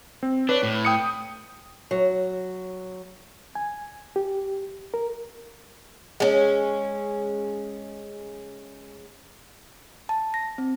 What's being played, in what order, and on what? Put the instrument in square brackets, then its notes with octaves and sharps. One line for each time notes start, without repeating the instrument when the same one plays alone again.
[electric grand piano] C4
[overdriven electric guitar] D4 [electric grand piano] B4 C#5
[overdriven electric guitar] A2
[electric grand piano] G5 D#6 C#7
[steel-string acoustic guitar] F#3
[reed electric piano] G#5
G4
A#4
[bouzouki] G#3 C#4
[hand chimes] A5
A#6
C4